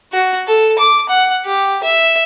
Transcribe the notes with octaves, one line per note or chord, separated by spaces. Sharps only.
F#4
A4
D6
F#5
G4
E5